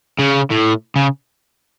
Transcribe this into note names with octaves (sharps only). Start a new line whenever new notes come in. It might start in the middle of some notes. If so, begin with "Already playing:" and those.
C#3
A2
C#3